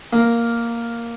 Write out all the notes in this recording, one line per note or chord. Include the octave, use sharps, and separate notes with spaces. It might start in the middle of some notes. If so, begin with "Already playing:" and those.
A#3